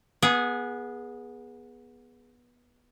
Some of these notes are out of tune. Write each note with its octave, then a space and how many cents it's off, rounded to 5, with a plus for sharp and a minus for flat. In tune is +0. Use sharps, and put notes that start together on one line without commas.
B3 -20 G#4 +0